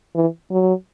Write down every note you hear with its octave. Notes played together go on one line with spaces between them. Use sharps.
E3
F#3